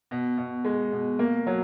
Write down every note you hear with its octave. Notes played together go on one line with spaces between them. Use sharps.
B2
B2
G#3
B2
A#3
F#3